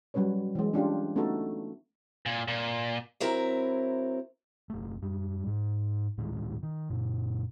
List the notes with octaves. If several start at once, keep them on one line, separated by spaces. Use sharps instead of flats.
F#3 G3 C#4 B4 C#5
E3 G#3
C#4 D4 F4 G4
A3 B3 C#4 D#4 F#4 A4
A#2
A#2
F#3 C4 E4 A#4
F#1 A3
F#2 G3
G#2
D2 A2 D#3 G#3
D#3
F#2 A#2